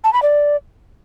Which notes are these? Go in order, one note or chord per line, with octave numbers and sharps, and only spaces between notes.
A5
B5
D5